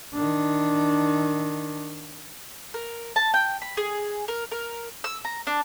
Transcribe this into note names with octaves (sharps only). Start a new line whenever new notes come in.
D#3 D4
A#4
A5
G5
B5
G#4
A#4
A#4
E6
A#5
D4